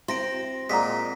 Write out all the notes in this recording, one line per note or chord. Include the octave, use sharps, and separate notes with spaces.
C4 E4 F#4 E5 C6 A#6 D7
A#2 G#3 G#4 F#5 A#5 B6